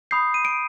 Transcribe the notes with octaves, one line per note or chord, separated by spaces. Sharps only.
B5 D#6 G6 C7
D#7
D7